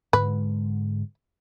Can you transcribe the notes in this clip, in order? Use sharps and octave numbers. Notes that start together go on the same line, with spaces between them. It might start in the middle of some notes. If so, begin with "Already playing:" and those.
G#2 D3 G#3 B4